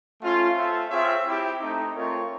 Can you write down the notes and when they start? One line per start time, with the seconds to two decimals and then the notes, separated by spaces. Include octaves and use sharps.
0.20 A3 C#4 F4
0.55 C4 F4 A4 C5 E5
0.89 C4 F4 G#4 C#5 E5
1.24 C4 E4 G4
1.60 A3 C4 D#4
1.95 A3 C4 F4 A#4 C#5